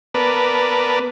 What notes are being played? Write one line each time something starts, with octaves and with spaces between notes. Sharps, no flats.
B3 A#4 B4 D5 A5